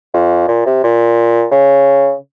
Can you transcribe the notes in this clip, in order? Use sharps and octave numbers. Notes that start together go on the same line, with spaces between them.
F2
A#2
C3
A#2
C#3